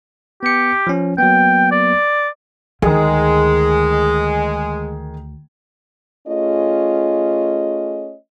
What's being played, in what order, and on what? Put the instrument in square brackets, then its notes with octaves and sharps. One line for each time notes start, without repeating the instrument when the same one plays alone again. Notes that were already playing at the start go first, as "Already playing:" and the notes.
[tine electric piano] B3 C#7 [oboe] G4
[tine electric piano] F3 C#4
[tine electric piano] F#3 A#3 B3 [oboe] G5
[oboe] D5
[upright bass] D2 [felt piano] D#3 G#4 [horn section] G#3
[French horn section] A3 C#4 F4 G#4 D#5